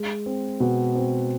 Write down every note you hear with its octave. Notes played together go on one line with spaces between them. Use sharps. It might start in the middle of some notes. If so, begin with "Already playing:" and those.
Already playing: G#3
C4
B2
C4